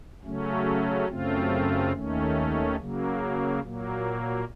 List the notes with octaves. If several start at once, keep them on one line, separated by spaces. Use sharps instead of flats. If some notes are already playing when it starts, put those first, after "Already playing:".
C#3 F#3 A3 C#4
F#2 C#3 A3 C4 F4
D#2 D#3 A3 C#4
C#3 F#3 A#3
A#2 F#3 A#3